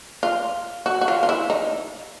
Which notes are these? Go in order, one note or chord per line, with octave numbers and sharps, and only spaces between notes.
F4
F#4
F#4
F4
F4
E4
D#4